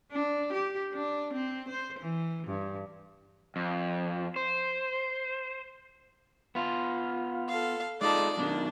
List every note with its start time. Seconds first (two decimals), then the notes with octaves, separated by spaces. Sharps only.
0.11 D4
0.53 G4
0.94 D4
1.33 C4
1.69 C5
1.99 E3
2.47 G2
3.56 F2
4.36 C5
6.55 B3 F4
7.49 A4 F5
8.01 G#3 D#4 F4 A4 D5
8.37 F#2 B2 D#3 D4